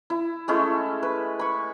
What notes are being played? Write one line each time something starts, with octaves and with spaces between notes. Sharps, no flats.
E4
G#3 A3 C#4 E4
B4
B5 C#6